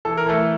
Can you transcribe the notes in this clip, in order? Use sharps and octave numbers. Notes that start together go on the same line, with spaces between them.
E3 A4
A#4
E3 A3 A4